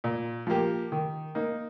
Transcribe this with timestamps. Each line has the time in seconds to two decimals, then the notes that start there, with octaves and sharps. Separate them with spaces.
0.04 A#2
0.47 F3 A#3 G4
0.92 D#3
1.35 A#3 D#4